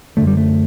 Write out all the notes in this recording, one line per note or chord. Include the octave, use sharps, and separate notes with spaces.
F#2 D3 A3
G3
A3